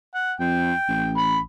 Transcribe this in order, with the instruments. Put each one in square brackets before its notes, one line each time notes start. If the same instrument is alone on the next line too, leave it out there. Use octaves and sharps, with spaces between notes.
[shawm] F#5
[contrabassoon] F2 [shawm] G5
[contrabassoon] A1
[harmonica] B5